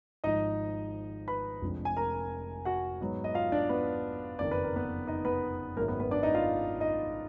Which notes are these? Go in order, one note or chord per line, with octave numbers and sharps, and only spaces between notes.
G#1 G#2 F3 D#4 D#5
B4 B5
F1 F2 F3 G#3 D4
G#5
A#4 A#5
F#4 F#5
G#2 F#3 B3 D#4
D#5
F4 F5
D4 D5
B3 B4
F#1 F2 D#3 A#3 D5
B4
A#4
B3 B4
D#4 D#5
B3 B4
G#1 F#2 D#3 F#3 A#3 A#4
B3 B4
B3 B4
D4 D5
D#4 D#5
F4 F5
D#4 D#5